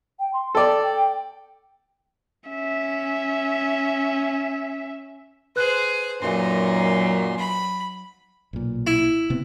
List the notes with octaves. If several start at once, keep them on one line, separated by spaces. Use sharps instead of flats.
G5
C6
A4 D5 G5
C#4 E5
G#4 B4 C5 F#6
F#2 A#2 F#3 D#4 C6
B5
B1 A#2
E4
C3 B3 C4